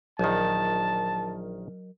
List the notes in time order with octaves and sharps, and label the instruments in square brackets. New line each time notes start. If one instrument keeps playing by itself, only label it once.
[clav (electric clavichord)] A#1 D#3 [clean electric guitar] F#3 A#4 D#5 [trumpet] A5